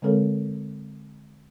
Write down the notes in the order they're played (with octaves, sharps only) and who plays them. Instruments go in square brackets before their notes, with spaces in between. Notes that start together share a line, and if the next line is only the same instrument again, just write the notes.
[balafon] D3 G#3 C4 A4 A#4 C#5